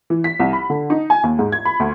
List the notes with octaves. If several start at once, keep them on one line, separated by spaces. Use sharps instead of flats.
E3
B6
C2
B5
D3
D#4
G#5
D#2
G#2
G#6
B5
D2